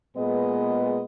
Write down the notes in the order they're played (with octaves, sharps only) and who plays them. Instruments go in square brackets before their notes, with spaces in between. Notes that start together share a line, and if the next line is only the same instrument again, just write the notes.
[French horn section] A#2 G#3 B3 G#4 B4 D#5